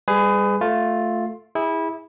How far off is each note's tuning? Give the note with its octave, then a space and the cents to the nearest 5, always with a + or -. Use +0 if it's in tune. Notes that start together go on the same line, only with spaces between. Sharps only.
G3 +30 G#4 +0 B4 +30
A3 +0 F4 +10
E4 -20 G#4 -30